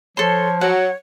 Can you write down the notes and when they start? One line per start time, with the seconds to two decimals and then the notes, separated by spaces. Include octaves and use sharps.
0.17 F3 A4 C#5 C6
0.61 F#3 C#5 F#5